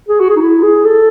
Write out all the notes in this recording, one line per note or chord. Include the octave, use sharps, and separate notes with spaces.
G#4
F#4
G#4
D#4
E4
G#4
A4